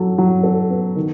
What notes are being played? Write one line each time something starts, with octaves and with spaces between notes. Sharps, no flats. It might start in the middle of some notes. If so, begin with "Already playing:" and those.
Already playing: F#3 A4
F#3
A4
B3
D#3